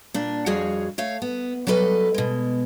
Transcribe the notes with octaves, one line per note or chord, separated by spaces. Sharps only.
A#2 D4
F2 G3 F#4 G#4 C#5 F5
A3 C#5 F5
B3
F#3 G3 A4 B4 D#5
B2 G#3